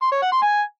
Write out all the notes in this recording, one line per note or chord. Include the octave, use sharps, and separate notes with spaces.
C6
C#5
F#5
C6
G#5